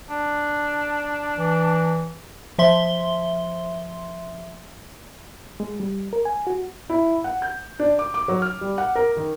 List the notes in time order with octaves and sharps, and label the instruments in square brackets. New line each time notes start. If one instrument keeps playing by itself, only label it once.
[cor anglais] D4
[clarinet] E3
[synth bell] F3 E5 C6 G7
[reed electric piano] G#3
G3
A#4
G#5
F#4
[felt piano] E4
F#5
G6
D4
D6
D6
F#3
F6
G3
F#5
A#4
D#3